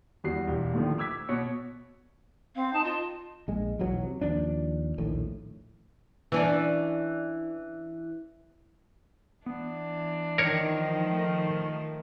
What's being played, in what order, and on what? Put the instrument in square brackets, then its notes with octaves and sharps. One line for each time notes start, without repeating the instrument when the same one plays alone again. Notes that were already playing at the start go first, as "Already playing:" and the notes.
[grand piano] E2 G3 F#4 C7
E1 G4
A2 D3 D#3 F3
D6 E6 G#6 B6
B2 C#5 C#7
[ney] C4 [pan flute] F5
[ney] D#4 [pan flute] A5
[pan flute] F4 [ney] D#5
[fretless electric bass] A#1 G#3
B1 E2 B2 F#3
C3
D#2 F3 D4
A#1 D#2 A2
[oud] E3 C#4 D4
[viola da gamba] E3 D4 [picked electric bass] B3
[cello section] D#3 F3 [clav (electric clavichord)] A#4 C#5
[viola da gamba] A3